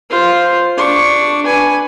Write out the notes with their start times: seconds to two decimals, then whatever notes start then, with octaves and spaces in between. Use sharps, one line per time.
0.10 F4 C5
0.77 D4 C#6
1.45 B4 G#5